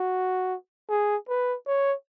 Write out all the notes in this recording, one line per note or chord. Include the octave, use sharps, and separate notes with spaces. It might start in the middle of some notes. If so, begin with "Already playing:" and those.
Already playing: F#4
G#4
B4
C#5